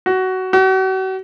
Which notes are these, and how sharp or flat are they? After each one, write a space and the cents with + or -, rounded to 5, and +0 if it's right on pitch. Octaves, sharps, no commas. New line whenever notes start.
F#4 +15
F#4 +40